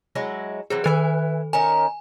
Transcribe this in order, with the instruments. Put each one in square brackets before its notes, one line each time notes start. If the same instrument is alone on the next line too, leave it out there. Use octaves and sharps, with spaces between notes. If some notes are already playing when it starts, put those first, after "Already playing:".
[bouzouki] F#3 G#3 E4
[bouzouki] E3 F#3 C4 [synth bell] G#4
[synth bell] D#3 A4 [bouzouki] B4 E5 G#5
[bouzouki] D#3 C#4 A#4 [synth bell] G#5